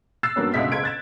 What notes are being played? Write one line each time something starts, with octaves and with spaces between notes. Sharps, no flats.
E6 F#6 A6 C7 E7
G2 F#3 A#3 B3 C#4
G1 C#2 B2 E5 B6
F#1 C#2 G#6 D7
F#6 A6 E7